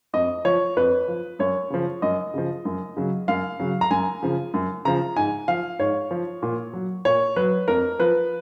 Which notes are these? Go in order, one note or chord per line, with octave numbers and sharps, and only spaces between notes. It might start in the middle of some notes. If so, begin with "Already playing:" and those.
F2 D#5
F3 C#5
F2 B4
F3
F#2 C#5
C#3 F3
F#2 D#5
C#3 F3
F#2
C#3 F#3
F#2 F5
C#3 F#3
A#5
F#2 G#5
C#3 F3
F#2
C#3 F3 A#5
G#2 G#5
F3 F5
G#2 C#5
F3
A#2
F#3
A#2 C#5
F#3 B4
F2 A#4
F3 B4